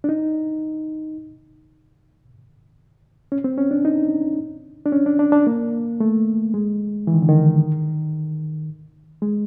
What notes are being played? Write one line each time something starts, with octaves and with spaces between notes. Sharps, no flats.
D4
D#4
C#4
C4
C#4
D4
D#4
D4
C#4
D4
D4
D4
A#3
A3
G#3
E3
D#3
D3
D#3
G#3